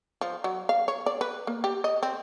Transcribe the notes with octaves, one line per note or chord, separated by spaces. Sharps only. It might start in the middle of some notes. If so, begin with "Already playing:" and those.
F3
F#3
F5
C#5
D5
B4
A#3
G4
D#5
C4